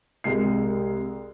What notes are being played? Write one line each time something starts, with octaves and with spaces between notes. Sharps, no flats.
C2 G#3 C7